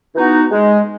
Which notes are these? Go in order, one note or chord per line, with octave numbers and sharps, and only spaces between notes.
E3 B3 D#4 F#4
G#3